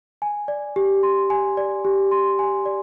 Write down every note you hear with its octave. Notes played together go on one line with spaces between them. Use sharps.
G#5
D5
G4
C6
G#5
D5
G4
C6
G#5
D5